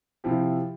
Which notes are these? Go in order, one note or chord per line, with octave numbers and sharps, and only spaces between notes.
C3 F3 C4 E4 G4